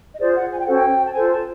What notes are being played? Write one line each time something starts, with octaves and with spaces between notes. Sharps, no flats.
D#5
F4 G#4 C5 D5
F#5
G#5
G5
C#4 F#4 A4 C5 F#5
G5
A5
F4 A4 C5 G#5
A5